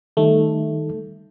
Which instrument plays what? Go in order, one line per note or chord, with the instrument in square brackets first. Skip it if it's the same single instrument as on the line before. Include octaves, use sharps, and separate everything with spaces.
[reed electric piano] D#3 G3 D#4 [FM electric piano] A3